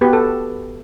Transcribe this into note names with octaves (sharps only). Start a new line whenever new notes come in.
B3 F#4 G4 B4
A4